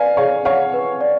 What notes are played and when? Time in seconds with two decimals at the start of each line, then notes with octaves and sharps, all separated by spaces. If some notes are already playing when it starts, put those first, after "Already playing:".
Already playing: B4 D5 F5 G#5
0.17 G#4 C#5 F5
0.45 C#5 F5 F#5
0.74 B4
1.01 D5